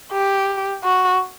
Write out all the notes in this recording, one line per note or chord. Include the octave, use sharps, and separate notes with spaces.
G4
F#4